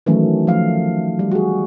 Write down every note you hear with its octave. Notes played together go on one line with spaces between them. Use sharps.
D#3 E3 F#3 A3 C#4
F3 A3 F5
G3
F#4 G#4